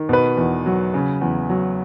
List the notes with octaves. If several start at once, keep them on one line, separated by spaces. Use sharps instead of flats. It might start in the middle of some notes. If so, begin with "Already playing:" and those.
Already playing: D#3
B2 B4
E2
F#3
C#3
E2
F#3